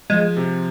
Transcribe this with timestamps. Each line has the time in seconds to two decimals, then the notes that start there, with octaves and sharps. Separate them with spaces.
0.10 F3 G#3
0.37 C3